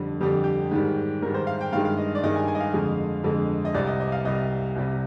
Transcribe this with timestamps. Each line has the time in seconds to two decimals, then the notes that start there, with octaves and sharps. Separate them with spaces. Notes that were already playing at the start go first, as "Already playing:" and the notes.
Already playing: F2 D3 G3
0.21 F2 D3 G3 G4
0.44 G4
0.71 G#2 D#3 G3
1.22 G#2 D#3 G3 A#4
1.34 C5
1.47 F5
1.61 G5
1.73 G2 D#3 G#3 F5
1.85 F5
1.97 D#5
2.15 D5
2.23 G2 D#3 G#3 D#5
2.36 G#5
2.48 G#5
2.55 D#5
2.60 F5
2.73 F2 D3 G#3
3.24 F2 D3 G#3
3.65 D#5
3.74 C2 C3 G3 D5
3.87 D#5
4.00 D#5
4.12 F5
4.25 C2 C3 G3 D#5
4.76 C2 C3 G3